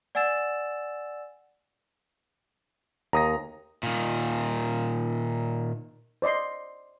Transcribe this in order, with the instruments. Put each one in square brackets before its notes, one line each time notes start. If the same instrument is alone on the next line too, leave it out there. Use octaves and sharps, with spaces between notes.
[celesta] D5 F#5 G#5 E6 A6 E7
[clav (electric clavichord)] D#2 [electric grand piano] A#5 D#6 A#6
[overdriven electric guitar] A#2 D#3
[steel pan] C5 D5 D#5 C6